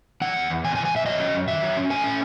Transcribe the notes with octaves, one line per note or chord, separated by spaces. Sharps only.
E3 F#5
E2
E2
C3 G#5
G#5
E3
G#5
E2 E5
F#3 D#5
C#4
F#2
D#3 E5
F#3
C#4
A3 G#5
C#4